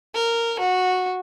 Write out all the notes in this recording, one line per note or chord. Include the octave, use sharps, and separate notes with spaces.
A#4
F#4